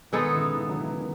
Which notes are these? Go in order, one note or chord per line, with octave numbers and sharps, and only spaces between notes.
B2 D#3 G#3 B3 D#4 A4
D#3
C#3 E3
C#3 E3
F#3
C#3 E3
D#3